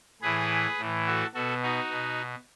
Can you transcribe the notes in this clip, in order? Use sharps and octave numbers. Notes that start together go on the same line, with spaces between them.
A2 E3 G#4 B4
A2 E3
F#4 A4
B2 F#4 A4
D#4 F#4
B2